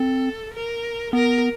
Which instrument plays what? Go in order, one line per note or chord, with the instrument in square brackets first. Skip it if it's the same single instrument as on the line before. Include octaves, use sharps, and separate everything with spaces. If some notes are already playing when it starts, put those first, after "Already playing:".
Already playing: [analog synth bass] C4 [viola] A4
[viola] A#4
[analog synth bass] B3 [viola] A#4